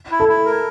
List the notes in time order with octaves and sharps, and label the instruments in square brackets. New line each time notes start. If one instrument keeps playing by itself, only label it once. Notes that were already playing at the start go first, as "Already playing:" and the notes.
[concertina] E4
[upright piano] A4
[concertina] E4
A#4